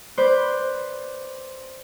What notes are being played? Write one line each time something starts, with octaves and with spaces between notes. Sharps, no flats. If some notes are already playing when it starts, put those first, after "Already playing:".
B4 C5 D5